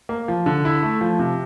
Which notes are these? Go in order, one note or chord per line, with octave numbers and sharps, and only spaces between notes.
A#3
F3
D3
E4
A3
F3
C3